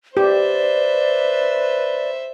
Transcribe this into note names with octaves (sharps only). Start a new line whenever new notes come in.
G4 B4 C5 D5 E5